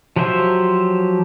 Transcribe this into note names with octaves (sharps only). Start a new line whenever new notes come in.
F3 F#3 G4 C5 E5